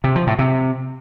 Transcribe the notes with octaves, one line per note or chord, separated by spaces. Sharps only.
C3
F3
A2
C3